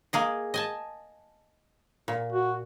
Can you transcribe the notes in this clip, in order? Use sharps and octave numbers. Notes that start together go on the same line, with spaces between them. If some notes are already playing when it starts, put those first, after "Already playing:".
A#3 G#4 D#5
D#5 G#5 A5
A#2
F#4